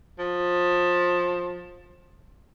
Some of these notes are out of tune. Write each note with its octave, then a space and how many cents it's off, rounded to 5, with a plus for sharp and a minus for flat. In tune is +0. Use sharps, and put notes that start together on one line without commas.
F3 +20